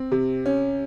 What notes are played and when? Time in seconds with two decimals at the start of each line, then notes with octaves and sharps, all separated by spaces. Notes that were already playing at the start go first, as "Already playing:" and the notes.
Already playing: C4
0.12 C3
0.46 C#4